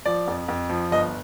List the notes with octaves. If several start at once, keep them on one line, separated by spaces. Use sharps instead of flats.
F3 D5
F2
F2
F3
G1 D#5